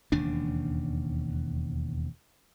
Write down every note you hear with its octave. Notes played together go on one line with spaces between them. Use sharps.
E1 D#2 C#3 D4